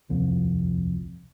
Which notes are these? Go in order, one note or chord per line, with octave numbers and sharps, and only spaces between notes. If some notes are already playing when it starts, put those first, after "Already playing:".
D#1 C2 F2